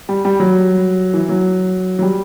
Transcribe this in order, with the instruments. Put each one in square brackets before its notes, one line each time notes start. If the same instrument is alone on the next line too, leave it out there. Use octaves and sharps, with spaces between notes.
[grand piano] G3
G3
F#3
E3
F#3
F#3
G3